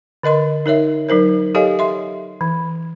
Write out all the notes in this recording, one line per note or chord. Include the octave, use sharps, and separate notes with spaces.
D3 A#4 D#5 C6
D#4 A#4 C#5 E5
F#3 D#4 A#4 C5
G4 A4 C#5 D#5 F5 G#5
E5 C6
E3